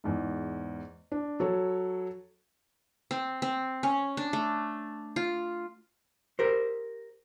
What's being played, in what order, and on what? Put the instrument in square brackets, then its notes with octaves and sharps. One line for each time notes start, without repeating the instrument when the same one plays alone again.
[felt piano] E2 G#2
D4
F#3 A4 C#5
[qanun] C4
C4
C#4
D4
A3
F4
[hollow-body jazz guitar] G4 A#4 C5